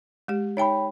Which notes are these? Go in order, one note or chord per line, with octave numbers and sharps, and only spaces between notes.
G#3 G4
D#4 C#5 E5 G5 A5 B5